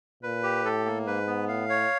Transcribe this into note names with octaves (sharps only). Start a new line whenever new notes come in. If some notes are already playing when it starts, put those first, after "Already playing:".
A#2 B4
G4
A2 A4
A#3
G#2 B4
B3
A2 F5
C#5